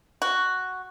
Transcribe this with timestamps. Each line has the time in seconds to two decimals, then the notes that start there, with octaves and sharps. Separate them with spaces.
0.22 F#4